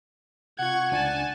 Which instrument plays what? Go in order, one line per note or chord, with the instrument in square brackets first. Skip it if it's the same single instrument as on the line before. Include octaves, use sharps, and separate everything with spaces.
[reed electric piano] C3 F4 [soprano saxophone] F#5 [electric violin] C#6 G#6
[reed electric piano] C#2 D4 A6 [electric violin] G#5 A5